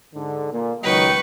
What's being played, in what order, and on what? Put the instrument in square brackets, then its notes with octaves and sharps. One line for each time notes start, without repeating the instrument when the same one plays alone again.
[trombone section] G#2 D3
A#2
[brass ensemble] C#2 D#5 G5 [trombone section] D#3 F#3 [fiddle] B4 C#6